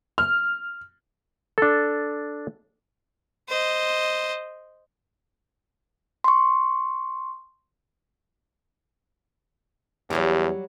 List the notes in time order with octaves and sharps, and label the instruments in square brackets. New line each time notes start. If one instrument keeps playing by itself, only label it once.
[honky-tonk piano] F6
[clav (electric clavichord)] D4 A4
[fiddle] C5 D#5
[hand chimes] C6 C#6
[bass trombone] E2 [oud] F#3 G3 G4